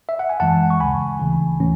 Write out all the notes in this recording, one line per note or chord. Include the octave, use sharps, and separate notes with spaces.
E5
F#5
G#5
F#2 E3 G#3 F#5 A5
C#6
D2 C#3 G#3 G#5 B5
D2 C#3 E3
A2 E3 A3 C#4